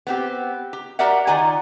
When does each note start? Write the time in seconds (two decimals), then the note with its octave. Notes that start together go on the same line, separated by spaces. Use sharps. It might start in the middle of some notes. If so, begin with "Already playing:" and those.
0.07 B3 C4 G4
0.73 G4
0.99 F#4 G4 A#4 D5 E5 F#5
1.27 D#3 F4 D5 F#5 G#5